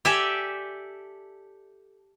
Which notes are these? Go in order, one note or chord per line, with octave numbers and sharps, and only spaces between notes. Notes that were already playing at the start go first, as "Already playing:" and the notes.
G4 A4 D5 E5 G#5